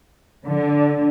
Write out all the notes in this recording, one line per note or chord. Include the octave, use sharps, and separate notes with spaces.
D3